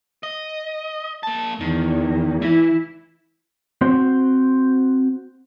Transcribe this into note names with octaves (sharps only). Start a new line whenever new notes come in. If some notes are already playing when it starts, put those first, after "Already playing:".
D#5
A#3 A5
E2 D#3
E3 E4
C4 F#4 C5